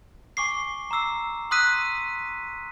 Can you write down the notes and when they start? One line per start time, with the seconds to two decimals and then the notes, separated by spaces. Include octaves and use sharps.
0.37 G#5 C#6 D6 C7
0.91 A#5 D6 E6 C7
1.51 C6 D#6 E6 F#6 B6 D#7